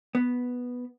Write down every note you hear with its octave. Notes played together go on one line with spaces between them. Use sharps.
B3